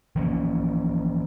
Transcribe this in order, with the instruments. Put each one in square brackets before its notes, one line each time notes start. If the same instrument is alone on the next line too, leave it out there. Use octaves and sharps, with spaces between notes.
[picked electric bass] E3 F3 A#3 C#4